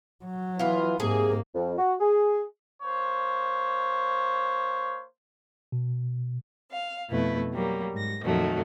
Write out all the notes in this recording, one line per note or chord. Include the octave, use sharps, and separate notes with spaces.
F#3
E3 B3 F4
G#2 C3 A#3 G#4
F2
F#4
G#4
A#3 C5 C#5
B2
F5
F2 B2 A3 E4 B4
F#3 G3 A#3
G#2 A#6
F2 A#2 D#3 F3 F#3 A3